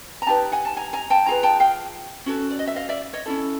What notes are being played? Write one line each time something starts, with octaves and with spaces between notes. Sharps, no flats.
A#5
D#4 G4 B4 G5 A5
F#5 G#5
A5
G#5 A#5
G#5 A#5
G5 A5
F4 G#4 B4 G#5 A#5
G5 A5
F5 G5
C#4 F#4 A4
D5
D#5
E5
D#5 F5
D5 E5
C#5 D#5
C#4 E4 A4